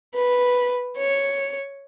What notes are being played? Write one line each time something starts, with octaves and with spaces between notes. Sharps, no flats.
B4
C#5